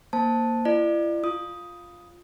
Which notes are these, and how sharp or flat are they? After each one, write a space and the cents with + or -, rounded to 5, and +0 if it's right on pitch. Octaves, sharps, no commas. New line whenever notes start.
A#3 +0 C5 +0 A5 +0
E4 +40 D5 +35
F4 +0 D#6 +5